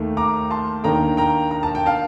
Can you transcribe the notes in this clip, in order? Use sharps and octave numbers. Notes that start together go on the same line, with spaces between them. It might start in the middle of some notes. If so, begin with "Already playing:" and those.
Already playing: D#2 D#3 A3
A#5 D6
A5 C6
D#2 D#3 A#3 D4 G5 A#5
G5 A#5
A#5
A5
G5
F5 A5